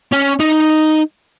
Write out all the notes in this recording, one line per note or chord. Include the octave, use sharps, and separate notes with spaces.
C#4
D#4